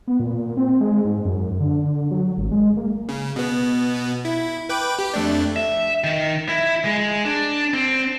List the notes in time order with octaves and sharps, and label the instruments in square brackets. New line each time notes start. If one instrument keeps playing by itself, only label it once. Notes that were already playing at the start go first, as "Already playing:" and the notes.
[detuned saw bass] B3
A#2
C4
G#3
G#2
F#2
D3
F#3
G#1
G#3
A#3
[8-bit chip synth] C#3
B2 B3
E4
B4 G5 D6
G4
F2 A3 D4
[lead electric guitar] E5
D#3
E4
G#3
D4
C4